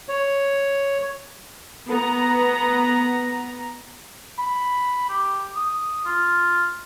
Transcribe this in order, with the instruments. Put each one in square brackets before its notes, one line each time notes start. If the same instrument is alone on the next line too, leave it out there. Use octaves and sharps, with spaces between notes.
[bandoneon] C#5
[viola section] B3 A#5
[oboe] B5
G4
D#6
F4